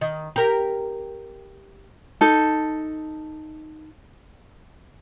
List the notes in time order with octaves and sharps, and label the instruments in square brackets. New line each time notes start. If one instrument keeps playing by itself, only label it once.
[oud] D#3
G4 A#4
[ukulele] D#4 A4